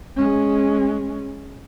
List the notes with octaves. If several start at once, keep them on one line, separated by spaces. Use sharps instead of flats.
G#3 C#4